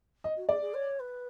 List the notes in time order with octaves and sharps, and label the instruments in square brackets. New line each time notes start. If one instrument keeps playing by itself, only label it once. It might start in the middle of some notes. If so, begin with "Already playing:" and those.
[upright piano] D#5
[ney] F#4
[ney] G#4 [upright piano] D5
[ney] G#4
C#5
B4